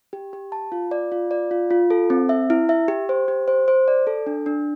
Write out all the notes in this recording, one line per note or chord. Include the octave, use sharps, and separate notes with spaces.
G4
G4
A5
F4
D5
F4
D5
F4
F4
A4
C4
E5
E4
E5
G4
C5
G4
C5
C5
D5
A4
D4
D4